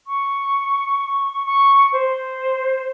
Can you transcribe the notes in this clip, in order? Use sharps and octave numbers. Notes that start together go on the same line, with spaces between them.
C#6
C#6
C5